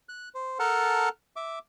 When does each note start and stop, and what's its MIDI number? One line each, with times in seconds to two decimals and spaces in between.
0.09 0.29 90
0.34 0.58 72
0.59 1.09 69
0.59 1.09 70
0.59 1.09 78
0.59 1.09 81
1.36 1.59 76
1.36 1.59 86